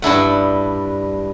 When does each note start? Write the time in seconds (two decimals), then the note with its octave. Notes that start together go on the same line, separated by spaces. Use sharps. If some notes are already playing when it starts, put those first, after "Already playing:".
0.02 G2 D4 E4 F#5